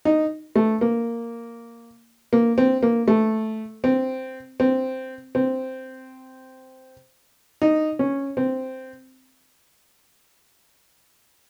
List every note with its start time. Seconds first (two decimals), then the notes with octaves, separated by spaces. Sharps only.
0.05 D#4
0.56 A3
0.81 A#3
2.33 A#3
2.58 C4
2.83 A#3
3.08 A3
3.84 C4
4.60 C4
5.35 C4
7.62 D#4
7.99 C#4
8.37 C4